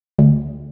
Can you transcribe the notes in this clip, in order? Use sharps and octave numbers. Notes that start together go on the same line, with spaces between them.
D2